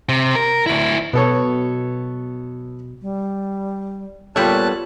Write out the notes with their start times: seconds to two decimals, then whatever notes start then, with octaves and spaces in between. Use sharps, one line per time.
0.09 C3
0.35 A#4
0.66 D2 E4
1.13 B2 B3 A4 C#5
3.02 G3
4.36 A#2 G3 B3 F4 A4 C#5 A5 F#6